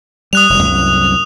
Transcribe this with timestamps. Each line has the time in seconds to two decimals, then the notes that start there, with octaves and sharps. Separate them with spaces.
0.33 G3 D#6 F#6 F7
0.50 F1 G3
0.61 C2 F#2